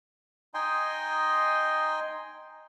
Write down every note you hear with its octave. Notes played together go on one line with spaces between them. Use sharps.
D#4 D#5 G5 G#5 C6